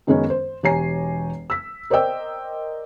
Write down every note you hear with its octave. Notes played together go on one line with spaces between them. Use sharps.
F#2 D#3 G#3 B3 C#4
C5
E1 G4 C#5 G#5 A#5 C7
E6 B6
A#4 C5 D5 D#5 G5 E6